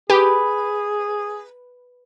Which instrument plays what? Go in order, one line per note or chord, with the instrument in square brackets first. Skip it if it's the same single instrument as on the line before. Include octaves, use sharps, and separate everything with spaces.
[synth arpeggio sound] G4 [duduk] G#4 [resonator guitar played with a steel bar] B4